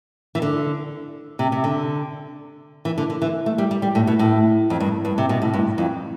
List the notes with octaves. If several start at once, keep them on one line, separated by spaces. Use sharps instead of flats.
E3
D3
C3
C3
D3
E3
D3
D3
E3
A3
G3
G3
G3
A2
B2
A2
F2
G2
G2
C3
B2
A2
G2
F2